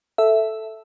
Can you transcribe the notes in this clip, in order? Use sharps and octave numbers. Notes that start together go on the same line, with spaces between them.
A4 E5